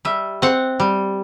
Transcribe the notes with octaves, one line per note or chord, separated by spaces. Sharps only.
G3 E5
C4 F#5
G3